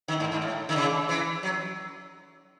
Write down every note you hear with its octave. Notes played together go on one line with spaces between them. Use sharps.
D#3
G#2
G#2
A2
D#3
C#3
E3
F#3